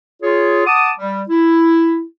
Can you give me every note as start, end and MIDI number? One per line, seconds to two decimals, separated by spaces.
0.23 0.64 65
0.23 0.64 68
0.23 0.64 73
0.67 0.92 78
0.67 0.92 81
0.67 0.92 86
0.67 0.92 87
0.98 1.23 55
1.29 2.02 64